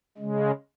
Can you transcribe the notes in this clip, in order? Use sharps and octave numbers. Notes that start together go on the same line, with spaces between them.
C#3 G#3